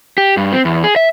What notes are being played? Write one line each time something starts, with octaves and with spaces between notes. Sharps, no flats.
G4
G2
C4
E2
G#4
E5